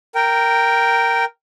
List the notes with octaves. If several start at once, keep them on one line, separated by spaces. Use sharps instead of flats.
A#4 G5